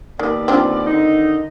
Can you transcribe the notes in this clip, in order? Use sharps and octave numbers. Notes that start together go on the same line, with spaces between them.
D#2 D#3 B3 D5
C4 D4 F4
D3 D#3 D#4